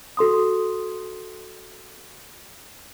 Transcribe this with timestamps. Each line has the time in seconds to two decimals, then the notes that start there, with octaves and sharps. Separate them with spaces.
0.17 F#4 A4 C6 D#6